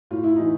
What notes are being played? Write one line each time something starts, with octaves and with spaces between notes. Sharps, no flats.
A2 F4
E4
E3 D#4